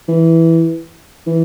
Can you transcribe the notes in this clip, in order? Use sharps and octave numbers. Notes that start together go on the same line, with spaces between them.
E3
E3